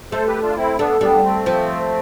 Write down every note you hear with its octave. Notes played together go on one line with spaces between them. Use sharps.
A3 A4 C5
G4 B4
D4 F4
C4 E4
A3 B3 D4
G3 B3 D4
A3 C4
F3